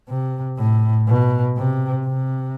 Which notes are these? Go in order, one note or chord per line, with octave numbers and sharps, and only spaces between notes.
C3
A2
B2
C3
C3